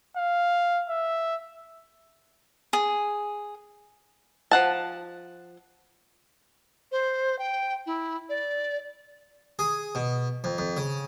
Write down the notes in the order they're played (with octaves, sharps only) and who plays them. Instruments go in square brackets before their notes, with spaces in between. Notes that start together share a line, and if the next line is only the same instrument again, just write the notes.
[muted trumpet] F5
E5
[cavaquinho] G#4
[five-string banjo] F3 F#5 A5
[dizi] C5
G5
E4
D5
[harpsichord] G#4
B2
F2
F2
C#3